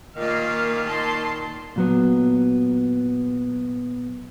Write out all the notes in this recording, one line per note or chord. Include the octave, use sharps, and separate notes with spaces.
A#2 D#3 A#3 F5
A5 C6
A#2 F#3 B3